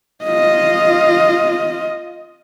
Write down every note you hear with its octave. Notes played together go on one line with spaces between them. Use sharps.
F4 D#5